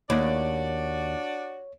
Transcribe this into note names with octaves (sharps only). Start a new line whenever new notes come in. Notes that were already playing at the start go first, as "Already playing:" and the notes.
D#2 D4 F#4 C#5 D5